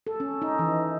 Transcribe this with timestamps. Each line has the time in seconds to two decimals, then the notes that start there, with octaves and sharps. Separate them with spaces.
0.07 A4
0.20 C#4
0.42 D#4
0.59 E3